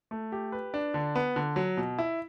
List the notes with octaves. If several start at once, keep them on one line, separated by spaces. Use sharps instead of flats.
A3
G4
B4
D4
D3
B3
D3
F#3
B2
E4